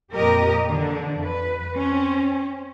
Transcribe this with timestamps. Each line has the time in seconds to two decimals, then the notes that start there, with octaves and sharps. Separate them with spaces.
0.13 F2 A#2 G4 A#4 D#5
0.68 D3 E3 D4
1.18 F2 B4
1.75 C4 C#4